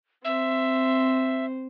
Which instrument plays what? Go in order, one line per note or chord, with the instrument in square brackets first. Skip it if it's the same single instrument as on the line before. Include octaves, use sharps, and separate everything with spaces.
[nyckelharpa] C4 C5 [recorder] E5